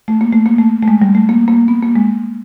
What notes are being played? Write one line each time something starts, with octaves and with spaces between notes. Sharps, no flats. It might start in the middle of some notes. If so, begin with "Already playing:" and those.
A3
A#3
A3
A#3
A3
A3
G#3
G3
A3
A#3
A#3
B3
A#3
G#3